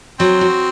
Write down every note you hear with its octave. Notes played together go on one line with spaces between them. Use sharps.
F#3 C4
F#4